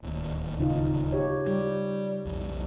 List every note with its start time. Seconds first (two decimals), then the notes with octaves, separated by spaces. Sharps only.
0.02 D1 D#2
0.59 C#3 D#4 F4
1.12 G4 C#5
1.47 G3 G4
2.25 B1 F2